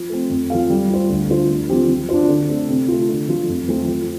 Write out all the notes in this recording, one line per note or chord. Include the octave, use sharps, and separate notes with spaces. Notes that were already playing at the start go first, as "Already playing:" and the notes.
Already playing: F3
A3 C4
F2
F3 C4 A4 F5
G3
F4 C5
D2
D3 A3 F4 C5
D3
F3 C4 G4
F3
D4 F4 C5
D3
A3 C4 A4
C3
A3 F4
D3
F3 A3 F4
F2
F3 A3 C4 F4
F3